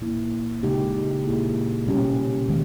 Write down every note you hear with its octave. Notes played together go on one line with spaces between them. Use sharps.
A#2 A#3 E4
C#3 G#3 D#4 G4
A#2 A#3 E4 G#4
B2 G3 C#4 G4
D#3 G#3